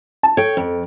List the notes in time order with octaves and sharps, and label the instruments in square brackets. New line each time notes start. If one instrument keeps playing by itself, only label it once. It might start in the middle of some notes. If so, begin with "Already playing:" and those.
[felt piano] A5
[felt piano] A4 [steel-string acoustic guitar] C#5 G5
[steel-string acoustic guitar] F2